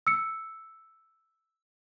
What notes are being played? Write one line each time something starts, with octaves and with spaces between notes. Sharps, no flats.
E6 C#7